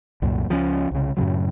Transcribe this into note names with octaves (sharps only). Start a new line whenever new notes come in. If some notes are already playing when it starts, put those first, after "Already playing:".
C2 F#2 A#2
C#2 F3 G3 C#4
C2 C#3
F#2 A2 C#3 F#3